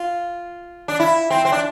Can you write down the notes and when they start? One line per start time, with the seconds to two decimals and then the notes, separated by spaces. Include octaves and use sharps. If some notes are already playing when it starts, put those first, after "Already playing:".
Already playing: F4
0.88 D4
1.00 E4
1.30 C4
1.45 C4
1.52 D4